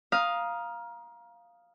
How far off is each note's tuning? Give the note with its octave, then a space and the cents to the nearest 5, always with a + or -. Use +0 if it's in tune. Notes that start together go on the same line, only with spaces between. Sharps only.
F5 +0 A#5 +25 D#6 +0